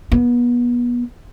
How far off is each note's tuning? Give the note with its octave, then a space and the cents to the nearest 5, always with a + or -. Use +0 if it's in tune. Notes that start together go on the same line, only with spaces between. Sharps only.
B3 -30